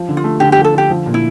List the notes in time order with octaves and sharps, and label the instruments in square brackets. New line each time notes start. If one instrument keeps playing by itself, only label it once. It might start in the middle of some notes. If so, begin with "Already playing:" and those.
Already playing: [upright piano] F3
D3
[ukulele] F4
[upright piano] A3
[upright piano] D3 [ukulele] G4
[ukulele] G4
[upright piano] F3
[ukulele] A4
[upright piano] D3 [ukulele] G4
[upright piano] F3
A#2
[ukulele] E4